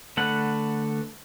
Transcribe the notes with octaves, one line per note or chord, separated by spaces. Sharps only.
D3 A3 B4 F#5